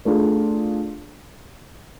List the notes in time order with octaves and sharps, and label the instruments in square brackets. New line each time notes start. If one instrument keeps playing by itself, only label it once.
[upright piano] A3 D4 F4 G#4